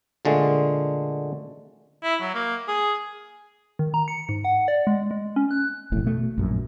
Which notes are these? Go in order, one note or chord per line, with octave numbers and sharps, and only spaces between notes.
A#2 D3 G#3 A3
E4
F#3
A#3
G#4
D#3
A#5
C#7
G#2
F#5
D5
G#3
G#3
C#4
F#6
F1 A#1 E2 A2
B2 A3
A#1 F#2 A#2